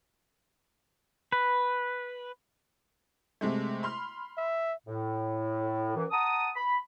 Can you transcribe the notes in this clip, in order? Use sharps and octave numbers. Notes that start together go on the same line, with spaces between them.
B4
C3 G#3 A3
B5 C6 F6
E5
A2
F#2 E3
F#5 A5 A#5 D#6
B5